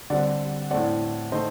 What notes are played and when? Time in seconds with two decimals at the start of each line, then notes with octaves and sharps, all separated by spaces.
0.10 D3 G3 C4 D5 F#5
0.71 A2 A3 C4 D5 F#5
1.32 D#3 A3 C5 D#5